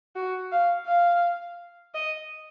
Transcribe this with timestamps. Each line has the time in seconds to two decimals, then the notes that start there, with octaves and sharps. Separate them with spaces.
0.16 F#4
0.52 F5
0.87 F5
1.94 D#5